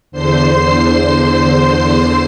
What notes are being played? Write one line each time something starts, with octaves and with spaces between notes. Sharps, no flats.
E2 D3 C5 C6 C7